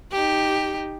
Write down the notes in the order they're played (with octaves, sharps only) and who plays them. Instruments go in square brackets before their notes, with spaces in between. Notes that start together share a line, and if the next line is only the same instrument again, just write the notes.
[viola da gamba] D#4 G4